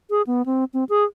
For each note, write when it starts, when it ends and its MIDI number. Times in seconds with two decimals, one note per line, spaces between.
0.10 0.22 68
0.27 0.45 59
0.46 0.65 60
0.74 0.84 60
0.89 1.04 68